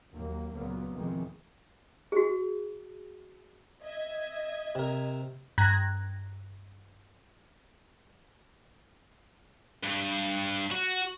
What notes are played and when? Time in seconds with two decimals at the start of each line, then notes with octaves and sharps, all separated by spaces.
0.12 D#2 F#3 A#3
0.54 C#2 A#2 F#3 A#3 B3
0.95 F2 B2 D#3 E3 G#3 C4
2.12 F#4 G#4
3.83 D#5 E5 G#6
4.75 C3 A#4
5.58 G2 A#5 F#6 G#6 A#6
9.83 G2
10.71 F#4